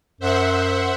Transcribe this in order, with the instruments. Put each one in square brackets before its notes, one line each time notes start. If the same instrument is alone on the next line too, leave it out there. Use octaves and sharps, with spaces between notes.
[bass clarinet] F#2 [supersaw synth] C5 E5 F#5